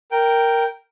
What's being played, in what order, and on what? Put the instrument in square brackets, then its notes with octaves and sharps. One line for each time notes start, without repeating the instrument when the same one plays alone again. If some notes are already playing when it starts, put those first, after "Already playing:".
[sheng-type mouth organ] A#4 G5